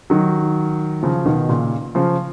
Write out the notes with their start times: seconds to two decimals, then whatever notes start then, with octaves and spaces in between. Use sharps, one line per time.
0.10 D#3 F#3
1.03 C#3 F3
1.26 B2 D#3
1.49 A#2 C#3
1.95 C#3 F3